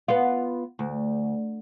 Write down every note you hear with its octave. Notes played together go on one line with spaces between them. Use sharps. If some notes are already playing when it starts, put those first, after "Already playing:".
B3 F4
D2